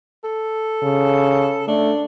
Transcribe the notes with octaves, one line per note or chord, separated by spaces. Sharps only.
A4
C#3
A3 D4